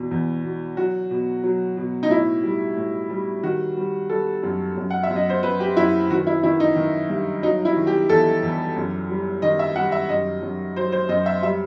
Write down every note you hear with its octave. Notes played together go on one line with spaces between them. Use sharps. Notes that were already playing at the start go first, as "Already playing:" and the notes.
Already playing: E2 B2
E2
B2
F#3 F#4
B2
F#3
B2
D#4
A2 E4
G3
A2
G3
D#3 F#4
G3
G3 A4
F#2
F#2
F#5
E5
F#2
D#5
C5
F#2 B4
G4
F#2 E4
D#3 F#4
E4
D#3 E4
D#4
D#3
G2
F#3 D#4
E4
D#3
G4
E2 A4
E2
F#2
G3
D#3 D#5
E5
G3 F#5
E5
F#2 D#5
F#2
F#3 C5
C5
F#2 D#5
E5
G3 E5